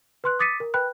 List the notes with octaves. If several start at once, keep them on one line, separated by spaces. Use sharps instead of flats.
B4 C6 F#6
D6 D#6 A6 B6 C#7 D#7
A#4
B4 G5 B5 F#6